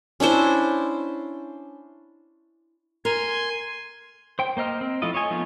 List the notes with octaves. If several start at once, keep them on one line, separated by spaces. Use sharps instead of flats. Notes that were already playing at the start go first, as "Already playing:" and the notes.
C#4 D4 E4 C5
A#4 G#5 C6
C5 G5
A#3 C5 D#5 F6
C4
F3 A3 E4 F4 D#5
C#5 D#5 G#5
F3 A3 B3 D#4 F4